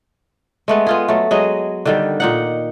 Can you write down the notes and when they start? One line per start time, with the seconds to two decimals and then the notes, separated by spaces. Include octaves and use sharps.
0.68 G#3 A3 B3
0.87 B3 F4 G#4
1.08 F#3 A3
1.31 F#3 G#3 G#4 D#5
1.85 D3 D#3 G3
2.20 A#2 D#4 F#5